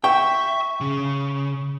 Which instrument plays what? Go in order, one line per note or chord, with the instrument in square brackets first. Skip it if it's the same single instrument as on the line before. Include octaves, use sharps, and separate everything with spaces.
[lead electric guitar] E5 [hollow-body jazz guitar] G5 [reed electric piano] C#6
[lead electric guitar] C#3